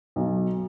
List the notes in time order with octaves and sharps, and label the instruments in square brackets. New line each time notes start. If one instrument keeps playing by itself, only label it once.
[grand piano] B1